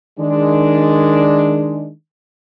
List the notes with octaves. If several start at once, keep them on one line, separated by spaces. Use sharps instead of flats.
D#3 G#3 D4